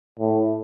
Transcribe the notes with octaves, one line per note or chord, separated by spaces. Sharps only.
A2